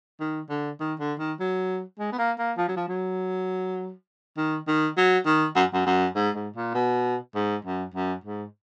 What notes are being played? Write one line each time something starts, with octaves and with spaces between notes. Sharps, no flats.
D#3
D3
D#3
D3
D#3
F#3
G#3
B3
A#3
A#3
F3
F#3
F3
F#3
D#3
D#3
F#3
D#3
F#2
F#2
F#2
G#2
G#2
A#2
B2
G#2
F#2
F#2
G#2